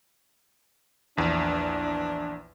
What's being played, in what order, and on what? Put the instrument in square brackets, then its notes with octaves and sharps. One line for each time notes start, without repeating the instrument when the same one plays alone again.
[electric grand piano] A#1 E2 [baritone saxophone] D4